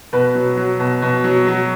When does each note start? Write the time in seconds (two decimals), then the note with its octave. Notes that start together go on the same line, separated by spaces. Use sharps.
0.13 B2 B4
0.35 F#3
0.57 F#3
0.80 B2
1.02 B2
1.24 F#3
1.47 F#3